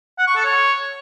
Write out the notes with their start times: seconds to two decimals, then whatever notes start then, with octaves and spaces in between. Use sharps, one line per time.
0.19 F#5
0.27 C#6
0.36 A4
0.45 C#5